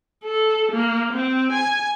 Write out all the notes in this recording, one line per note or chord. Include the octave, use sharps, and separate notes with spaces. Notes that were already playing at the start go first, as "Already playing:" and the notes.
A4
A#3
C4
G#5